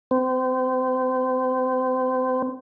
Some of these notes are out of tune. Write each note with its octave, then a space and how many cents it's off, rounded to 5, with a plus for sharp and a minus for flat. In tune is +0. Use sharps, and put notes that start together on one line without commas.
C4 -30